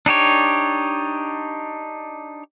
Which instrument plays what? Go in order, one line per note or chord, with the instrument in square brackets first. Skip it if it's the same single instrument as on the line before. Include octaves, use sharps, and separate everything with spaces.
[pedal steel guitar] D4 D#4 G4 C#5